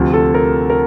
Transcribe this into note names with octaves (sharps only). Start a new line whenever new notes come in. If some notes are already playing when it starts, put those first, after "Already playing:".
Already playing: D2 C3 F3
A4
A#4
A#4